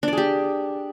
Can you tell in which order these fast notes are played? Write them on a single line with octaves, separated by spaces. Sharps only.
D4 D5 G#4 G4